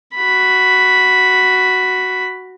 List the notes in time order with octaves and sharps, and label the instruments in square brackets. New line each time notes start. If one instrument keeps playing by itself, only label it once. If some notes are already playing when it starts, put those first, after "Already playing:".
[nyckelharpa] F#4 B5